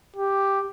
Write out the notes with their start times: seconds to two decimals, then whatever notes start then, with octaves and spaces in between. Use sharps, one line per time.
0.16 G4